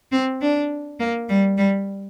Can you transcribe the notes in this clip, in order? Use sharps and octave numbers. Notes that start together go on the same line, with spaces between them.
C4
D4
A#3
G3
G3